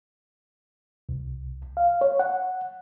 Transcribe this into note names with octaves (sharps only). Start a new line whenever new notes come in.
C2
F5
C#5
F#5